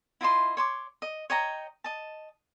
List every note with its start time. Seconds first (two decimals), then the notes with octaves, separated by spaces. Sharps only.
0.21 E4 F4 D#5 C6
0.57 C#5 C6 D6
1.02 D#5
1.30 C#5 D#5 G5 A#5
1.84 D#5 A5